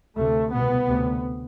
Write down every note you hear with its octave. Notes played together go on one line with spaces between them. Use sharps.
D2 C3 A3
C2 B2 B3
D2 C3